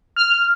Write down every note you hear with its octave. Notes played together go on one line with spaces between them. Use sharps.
F6